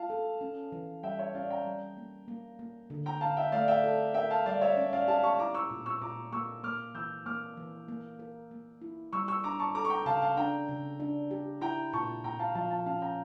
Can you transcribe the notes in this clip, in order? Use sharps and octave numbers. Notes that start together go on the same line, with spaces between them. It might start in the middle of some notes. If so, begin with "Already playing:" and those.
Already playing: F4 F5 A5
A4
C#4
E3
G3 E5 G5
C#5 E5
C#4 D5 F5
G5 A#5
G3
A#3
A#3
A#3
D3
G5 A#5
D3 F5 A5
E5 G5
A3 D5 F5
E5 G5
A4
A#4 E5 G5
F5 A5
G3 D5 F5
C#5 E5
C#4 D5
D5 F5
G4 F5 A5
A5 C#6
E4 A#5 D6
C#6 E6
A#2
C#6 E6
A#2 A#5 D6
A#3 C#6 E6
A#3 D6 F6
E3 E6 G6
A#3 D6 F6
E3
A#3
A#4
A#3
E4
G3 C#6 E6
C#6 E6
D4 A#5 D6
A5 C#6
A4 A#5 D6
C#6
G5 A#5
C#3 F5 A5
F5 A5
D4 G5 A#5
C#3
D4
G4
E4 G5 A#5
A#2 A5 C#6
A#2 G5 A#5
F5 A5
F3 F5 A5
F5 A5
C#4 F5 A5
G5 A#5